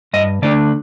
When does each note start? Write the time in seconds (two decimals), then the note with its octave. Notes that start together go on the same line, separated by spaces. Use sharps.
0.13 G2 D#5
0.42 D3 A3 D4 D5